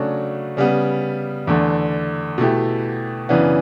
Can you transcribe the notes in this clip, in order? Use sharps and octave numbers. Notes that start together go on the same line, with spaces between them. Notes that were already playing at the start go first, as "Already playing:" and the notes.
Already playing: C#3 F#3 A3 D4 F#4
C#3 G3 B3
E2 D3 A3 D4
B2 A3 E4 G4
F#2 C#3 E3 B3 D4